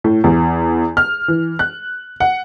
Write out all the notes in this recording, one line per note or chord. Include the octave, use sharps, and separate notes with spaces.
A2
E2
F6
E3
F#6
F#5